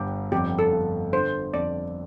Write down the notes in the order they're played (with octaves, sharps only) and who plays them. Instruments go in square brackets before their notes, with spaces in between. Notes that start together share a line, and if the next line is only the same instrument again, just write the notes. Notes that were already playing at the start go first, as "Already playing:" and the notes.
Already playing: [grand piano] G1 G2 [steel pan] G4
[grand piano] F2 [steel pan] G4
[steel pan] A4
[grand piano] G1
[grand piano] D3 [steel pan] C5
[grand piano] F2 [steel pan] D5